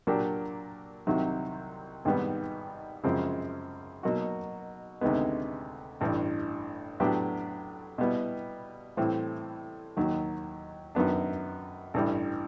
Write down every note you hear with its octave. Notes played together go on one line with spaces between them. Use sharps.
A#2 F#3 A#3 D4 G4
C2 C3 D#3 F#3
G#1 G#2 D#3 G3 B3
F#2 C#3 F3 G#3 C4
B2 F#3 A#3 D#4 F#4
D2 C3 D#3 G#3 B3
A1 G2 E3
A2 F#3 B3 D4 G4
B2 G3 B3 E4
A2 E3 G3 C4
D#2 D#3 F#3
F#2 D#3 F#3 B3 D4
A1 G2 E3 G3